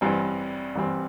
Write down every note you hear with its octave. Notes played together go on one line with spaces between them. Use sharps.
A1 G2 E3 G3 C4
A1 G2 E3 G3 C4